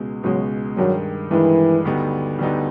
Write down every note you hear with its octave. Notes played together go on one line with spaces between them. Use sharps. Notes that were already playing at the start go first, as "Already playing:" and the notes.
Already playing: C#2 B2 G#3
C#2 B2 F#3 G#3
G2 D#3 F#3 G#3
G2 D#3 E3 G#3
D2 D3 G3 B3 D#4
D2 D3 G3 B3 D#4